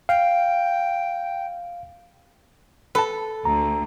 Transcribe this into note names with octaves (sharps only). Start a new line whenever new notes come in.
F5 G5
A4 B4 A5
D2 A#5